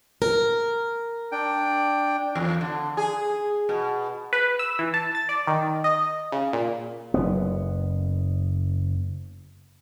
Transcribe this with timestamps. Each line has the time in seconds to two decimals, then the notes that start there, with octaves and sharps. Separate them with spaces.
0.22 A#4
1.32 D4 G5
2.35 E2
2.61 D3
2.97 G#4
3.69 B2
4.33 B4
4.59 E6
4.79 E3
4.94 A5
5.15 A6
5.29 D5
5.47 D#3
5.84 D#5
6.32 C#3
6.53 A#2
7.14 F#1 B3